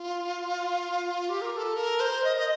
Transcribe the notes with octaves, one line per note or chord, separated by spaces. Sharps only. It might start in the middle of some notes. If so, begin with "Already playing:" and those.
Already playing: F4
G4
A#4
A#4
A4
A#4
C5
D#5
D#5